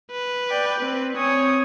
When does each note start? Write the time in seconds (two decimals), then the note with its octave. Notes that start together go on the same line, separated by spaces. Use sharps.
0.11 B4
0.50 D5 G5
0.80 C4
1.17 C4 C#5 G#5 D#6